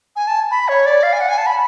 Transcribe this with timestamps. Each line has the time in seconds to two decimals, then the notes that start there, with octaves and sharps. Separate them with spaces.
0.16 G#5
0.27 A5
0.51 B5
0.68 C#5
0.86 D5
1.03 F5
1.13 G#5
1.20 F#5
1.29 G#5
1.38 A5
1.46 B5